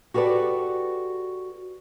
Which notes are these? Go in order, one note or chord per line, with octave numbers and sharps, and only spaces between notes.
F#4 G4 A4 B4 D5